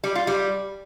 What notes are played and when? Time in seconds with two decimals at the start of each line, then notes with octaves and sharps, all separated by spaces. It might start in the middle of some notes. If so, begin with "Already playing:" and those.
0.04 G3
0.15 F4
0.27 G3